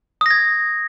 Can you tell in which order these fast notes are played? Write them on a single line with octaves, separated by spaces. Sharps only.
D#6 A#6 G#6